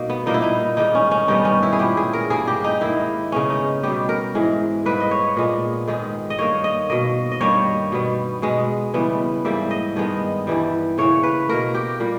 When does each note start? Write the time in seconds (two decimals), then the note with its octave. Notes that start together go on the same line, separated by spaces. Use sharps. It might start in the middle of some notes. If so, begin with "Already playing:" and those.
Already playing: G2 B2 A#3 D#4
0.10 B3
0.26 A#2 G3 A#3 D#4
0.34 E4
0.42 D#4
0.77 G#2 D#3 G3 D#4
0.95 C#4
1.11 C#4
1.28 G2 D#3 G3 B3 D#4
1.45 C#4
1.63 E4
1.73 G#4
1.79 A#2 G#3 B3 G4
1.97 G#4
2.13 A#4
2.30 G2 G3 A#3 G#4
2.47 G4
2.64 D#4
2.81 G#2 D#3 A#3 E4
3.32 C#3 G#3 B3 C#4
3.50 D#4
3.83 B2 G3 B3 G4
4.09 A#4
4.35 G#2 E3 G#3
4.86 G#2 G3 A#3 B4
5.00 D#5
5.11 C#5
5.37 A#2 G#3 B3
5.87 G#2 D#3 G#3
6.30 D#5
6.39 G2 D#3 A#3 C#5
6.64 D#5
6.90 B2 A#3 D#5
7.32 D#5
7.41 G2 D#3 G3 A#3 C#5
7.92 B2 G3 B3
8.42 B2 G#3 B3
8.94 C#3 E3 G3 B3
9.45 G#2 E3 G3 A#3 E5
9.71 D#5
9.96 G2 D#3 G#3 B3
10.47 G2 E3 G3
10.98 C#3 E3 A#3 C#5
11.23 B4
11.49 B2 A#3 A#4
11.75 G4
12.00 A#2 G3 A#3